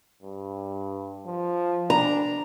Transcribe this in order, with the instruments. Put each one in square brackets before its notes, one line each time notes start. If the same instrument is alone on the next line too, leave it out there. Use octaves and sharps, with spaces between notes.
[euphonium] G2
F3
[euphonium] D4 [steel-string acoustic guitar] A#5